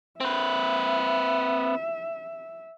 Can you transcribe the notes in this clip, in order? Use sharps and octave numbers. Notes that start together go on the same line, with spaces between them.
C4 B4 E5